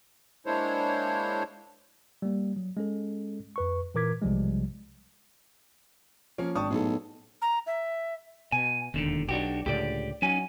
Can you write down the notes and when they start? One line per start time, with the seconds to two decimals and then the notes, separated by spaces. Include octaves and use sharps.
0.46 G#3 A#3 D4 E4 C5 C#5
2.22 G3 A#3
2.56 F#3
2.77 G#3 C#4 A4
3.56 F2 B4 C#6
3.95 A#2 E3 A#4 D6 G#6 B6
4.21 B1 C3 F3 G3 G#3
6.38 F3 A#3 C#4 C#5
6.55 G#1 D4 G5 A5 C#6 D#6
6.70 B1 A2 G#4 A4
7.42 A#5
7.67 E5
8.52 B2 G#5
8.94 E1 D#2 D3 D#3
9.29 B1 D4 F#4 G4
9.66 C#2 A2 D3 G4 D5
10.22 F#3 C#4 D#4 G#5